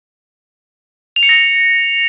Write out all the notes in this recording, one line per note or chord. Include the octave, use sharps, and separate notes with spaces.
F7
C#7
A#6